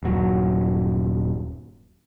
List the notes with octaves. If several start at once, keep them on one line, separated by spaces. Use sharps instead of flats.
D#1 G2 F#3